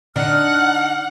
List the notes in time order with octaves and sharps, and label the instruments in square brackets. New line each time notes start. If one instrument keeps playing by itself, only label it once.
[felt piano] D3 [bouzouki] D4 D#4 [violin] F#5 [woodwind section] F6